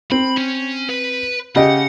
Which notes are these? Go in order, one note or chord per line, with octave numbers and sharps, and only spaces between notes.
C4 B5
C#4
B4
C#3 G4 D#5 F#5